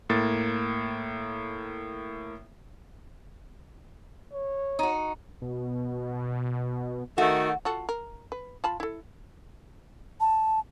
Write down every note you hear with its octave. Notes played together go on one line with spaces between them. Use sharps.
A2 A#3 A6
C#5
D#4 F#4
B2
D#3 A3 F#4
F4 F#4 A4
A#4
B4
F4 A5 B5
E4 A4
A5